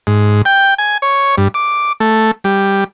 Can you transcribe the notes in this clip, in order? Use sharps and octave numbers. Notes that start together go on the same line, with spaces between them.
G#2
G5
G#5
C#5
G2
D6
A3
G3